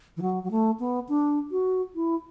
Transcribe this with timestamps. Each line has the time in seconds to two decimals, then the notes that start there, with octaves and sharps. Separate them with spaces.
0.17 E3
0.22 F#3
0.43 F#3
0.51 A3
0.79 B3
1.09 D4
1.51 F#4
1.95 E4